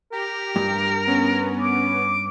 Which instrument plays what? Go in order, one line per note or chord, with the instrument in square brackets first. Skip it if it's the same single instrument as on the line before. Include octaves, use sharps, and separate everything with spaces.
[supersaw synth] G4 [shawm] A#4
[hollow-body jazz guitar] G2
[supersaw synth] B3 C#4
[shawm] D6